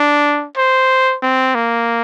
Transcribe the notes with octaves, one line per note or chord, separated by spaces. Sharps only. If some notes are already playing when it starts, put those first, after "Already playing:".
Already playing: D4
C5
C4
A#3